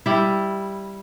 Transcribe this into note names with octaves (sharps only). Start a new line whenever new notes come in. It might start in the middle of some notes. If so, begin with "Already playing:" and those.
G3 E4